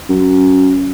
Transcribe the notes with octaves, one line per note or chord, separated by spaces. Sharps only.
F#2